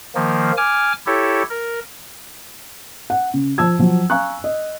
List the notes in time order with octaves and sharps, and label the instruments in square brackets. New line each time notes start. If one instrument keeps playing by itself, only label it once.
[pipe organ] D#3 F3 A#3
G#5 D6 F6
E4 G4 A4 C#5
A#4
[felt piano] F#5
C#3
F3 A5 E6 G#6
F3 F#3
F5 G#5 A#5 C#6 F#6
D#5